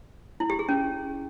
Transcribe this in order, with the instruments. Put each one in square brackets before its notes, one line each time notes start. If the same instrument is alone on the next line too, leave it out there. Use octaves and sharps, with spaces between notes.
[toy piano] E4
G4
G#4
C#4